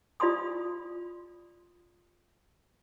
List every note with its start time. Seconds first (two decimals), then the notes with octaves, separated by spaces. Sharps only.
0.20 F4 D5 B5 C6 D#6